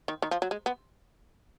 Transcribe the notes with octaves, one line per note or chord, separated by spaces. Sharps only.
D#3
D#3
F3
F#3
G#3
B3